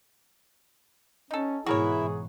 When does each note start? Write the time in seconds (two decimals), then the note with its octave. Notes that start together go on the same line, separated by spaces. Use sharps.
1.31 C#4 D#4 A4
1.66 G#2 B2 E3 E4 F#4 G#4 A#4 C#5